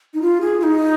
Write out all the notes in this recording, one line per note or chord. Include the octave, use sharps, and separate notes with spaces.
D#4
F4
G#4
F4
D#4